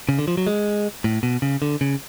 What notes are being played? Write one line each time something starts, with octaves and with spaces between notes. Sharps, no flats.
C#3
D3
F3
F#3
G#3
A2
B2
C#3
D3
C#3